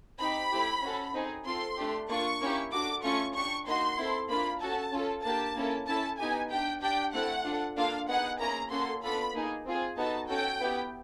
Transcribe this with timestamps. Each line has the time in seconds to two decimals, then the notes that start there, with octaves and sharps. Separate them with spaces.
0.19 C4 D#4 G4 B5
0.51 A3 C4 E4 G4
0.83 C#4 F#4 A4
1.14 C4 D#4 G#4
1.45 C4 F4 A4 C6
1.77 A3 D4 G4
2.09 A#3 D4 F4 C#6
2.41 A#3 C#4 E4 G4
2.72 D4 F#4 A4 D6
3.03 A3 C#4 F4 A4 C#6
3.35 D4 G4 C#6
3.66 A#3 D#4 F#4 C6
3.97 C4 E4 A4
4.29 A#3 D4 F4 B5
4.60 C#4 F#4 A4 A5
4.92 C#4 F4 A4
5.23 A#3 D4 G4 A5
5.55 A#3 C#4 E4 A4
5.87 C#4 E4 A4 A5
6.18 B3 D#4 G4 G#5
6.50 D4 G4 G5
6.82 D4 G4 G5
7.13 A3 C4 E4 A4 F#5
7.44 D4 F4 A4
7.77 A#3 D4 F4 A4 F5
8.08 B3 D#4 G#4 F#5
8.39 A#3 C#4 E4 G#4 A#5
8.70 A#3 C#4 F#4 A4 C6
9.03 B3 D4 F4 A4 B5
9.34 A#3 D#4 G#4
9.65 C4 F4 G#4
9.97 B3 D#4 F#4 A4 A5
10.29 C#4 F#4 A4 G5
10.60 B3 E4 G4